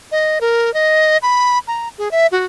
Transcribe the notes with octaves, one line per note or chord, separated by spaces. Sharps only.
D#5
A#4
D#5
B5
A#5
G#4
E5
F#4